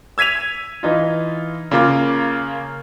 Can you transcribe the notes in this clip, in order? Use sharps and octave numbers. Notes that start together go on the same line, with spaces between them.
E6 G#6 B6 D#7 F7
E3 D#4 F4
C#3 A#3 F4 D6